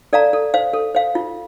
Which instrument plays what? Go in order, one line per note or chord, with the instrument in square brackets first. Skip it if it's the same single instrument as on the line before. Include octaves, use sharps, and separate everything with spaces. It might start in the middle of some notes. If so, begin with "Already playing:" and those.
[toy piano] A4 D5 F5 A#5
A4
C5 F5
A4
C5 F5
F4